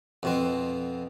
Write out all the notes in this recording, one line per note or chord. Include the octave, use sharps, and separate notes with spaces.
F2 B2 C4